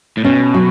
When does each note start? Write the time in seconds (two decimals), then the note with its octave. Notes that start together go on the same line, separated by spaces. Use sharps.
0.17 A2
0.24 B2 C#4
0.54 F#3